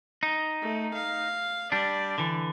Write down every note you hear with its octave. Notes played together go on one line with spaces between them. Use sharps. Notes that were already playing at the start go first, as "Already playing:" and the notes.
D#4
A3
F5
G3 D4 D5
D3 E3